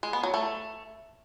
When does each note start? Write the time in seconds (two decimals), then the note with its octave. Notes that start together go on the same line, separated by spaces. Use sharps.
0.03 G#3
0.13 B3
0.23 F#3
0.34 A3